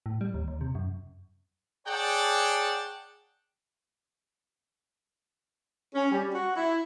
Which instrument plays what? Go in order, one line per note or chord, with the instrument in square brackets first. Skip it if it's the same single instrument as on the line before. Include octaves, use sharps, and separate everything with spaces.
[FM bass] A2
G3
D#2
D#2
C3
F#2
[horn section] G#4 C#5 D5 F#5 G5 A5
[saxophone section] C#4
G3
F#4
E4